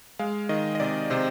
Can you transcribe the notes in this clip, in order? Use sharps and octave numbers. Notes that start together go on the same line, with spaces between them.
G#3 F5
D#3 D#5
D#5
C3 D5
C3 C5